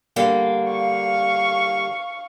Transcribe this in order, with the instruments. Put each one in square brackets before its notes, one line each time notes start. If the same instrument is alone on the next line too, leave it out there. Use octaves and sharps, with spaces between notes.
[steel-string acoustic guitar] D3 G3 A#3
[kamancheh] F5 C#6